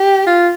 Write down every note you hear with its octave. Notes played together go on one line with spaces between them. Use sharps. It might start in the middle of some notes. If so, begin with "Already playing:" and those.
Already playing: G4
F4